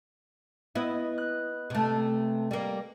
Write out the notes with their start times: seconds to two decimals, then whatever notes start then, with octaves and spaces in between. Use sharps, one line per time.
0.75 B3 E4 B4 D#5
1.18 F#6
1.70 C3 A3
2.51 G3 A#3